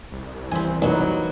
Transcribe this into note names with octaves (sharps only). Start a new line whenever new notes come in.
C2
E3 C4 E4 C5 G#5 B5
F#2 B2 F#3 A#3 D#4 B4